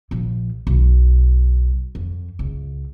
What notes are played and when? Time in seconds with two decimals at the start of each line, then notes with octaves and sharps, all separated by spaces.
0.11 A#1 F3
0.67 B1
1.95 F2
2.39 C#2